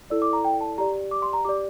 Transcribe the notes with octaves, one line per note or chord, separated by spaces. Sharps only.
E4 A4 D5 E6
D6
A#5
G5
A5
G4 D5 A#5
D6
C6
A#5
G4 D5 D6